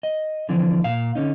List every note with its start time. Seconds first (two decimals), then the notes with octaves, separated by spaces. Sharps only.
0.03 D#5
0.49 D3 E3 F3 C4 D4
0.84 A#2 F5
1.15 D3 C#4 D#4